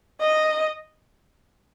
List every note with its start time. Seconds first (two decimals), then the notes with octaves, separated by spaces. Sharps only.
0.21 D#5